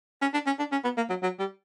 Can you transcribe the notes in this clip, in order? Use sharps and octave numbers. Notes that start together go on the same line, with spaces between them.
C#4
D4
C#4
D4
C#4
B3
A#3
F#3
F#3
G3